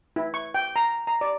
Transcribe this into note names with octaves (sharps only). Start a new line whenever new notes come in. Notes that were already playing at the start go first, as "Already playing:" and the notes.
E4
C#6
G5
A#5
A#5
D5